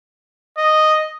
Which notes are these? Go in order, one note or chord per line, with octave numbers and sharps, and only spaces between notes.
D#5